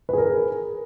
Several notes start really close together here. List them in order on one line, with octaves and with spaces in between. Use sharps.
B4 G#4 A#4